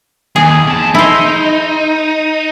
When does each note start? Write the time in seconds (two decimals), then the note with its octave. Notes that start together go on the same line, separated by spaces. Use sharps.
0.36 D#2 G#4
0.67 E2 A5
0.95 D#4 E4 C5